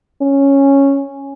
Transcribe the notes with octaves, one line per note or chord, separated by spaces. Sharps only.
C#4